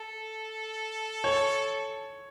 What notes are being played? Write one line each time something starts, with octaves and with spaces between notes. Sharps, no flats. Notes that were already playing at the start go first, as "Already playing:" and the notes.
Already playing: A4
C#5